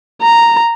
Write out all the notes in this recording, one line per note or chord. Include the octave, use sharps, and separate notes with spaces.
A#5